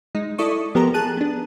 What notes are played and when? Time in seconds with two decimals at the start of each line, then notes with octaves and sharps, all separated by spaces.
0.15 G#3 D#4
0.38 E4 A4 D5 C#6 D#6
0.75 F3 B3 G4 A4 A#4 A#5
0.94 G#4 A5 F#6 D#7
1.17 B3 D4